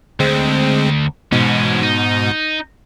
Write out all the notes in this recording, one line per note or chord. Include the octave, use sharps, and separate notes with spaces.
D2 G#3 C4
G#2 B2 E3 C#4
D#4